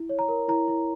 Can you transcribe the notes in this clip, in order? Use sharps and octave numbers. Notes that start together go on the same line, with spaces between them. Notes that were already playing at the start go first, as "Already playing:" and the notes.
Already playing: E4
C#5
A#5
A#4
E4 A#5
E4